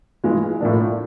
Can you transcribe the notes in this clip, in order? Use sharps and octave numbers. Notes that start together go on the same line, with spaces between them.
G2 E3 G#3
A2 F3 A#3 D4